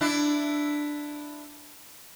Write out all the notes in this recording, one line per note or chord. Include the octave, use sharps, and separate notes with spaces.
D4 E4